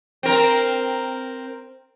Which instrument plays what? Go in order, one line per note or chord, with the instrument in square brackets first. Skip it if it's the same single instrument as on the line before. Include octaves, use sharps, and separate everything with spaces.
[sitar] C4 A#4